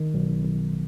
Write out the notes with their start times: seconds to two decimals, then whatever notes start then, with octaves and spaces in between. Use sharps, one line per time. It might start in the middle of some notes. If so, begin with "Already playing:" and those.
Already playing: D#3
0.14 B1
0.45 B1